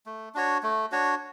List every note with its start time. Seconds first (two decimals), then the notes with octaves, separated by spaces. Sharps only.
0.06 A3
0.35 D4 F#4 C#5
0.63 A3
0.92 D4 F#4 C#5